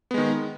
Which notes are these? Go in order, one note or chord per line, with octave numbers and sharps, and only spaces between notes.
D#3 G#3 B3